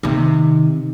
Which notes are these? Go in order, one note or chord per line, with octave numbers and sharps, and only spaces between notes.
C3 D#3